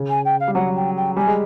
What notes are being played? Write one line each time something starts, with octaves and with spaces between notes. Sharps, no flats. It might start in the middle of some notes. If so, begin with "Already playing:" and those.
Already playing: C#3
G#5
G5
F5
G3
F#3 F#5
G5
G5
G3 G#5
G#3